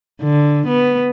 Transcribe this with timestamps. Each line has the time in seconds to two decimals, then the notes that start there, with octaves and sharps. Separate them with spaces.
0.22 D3
0.67 B3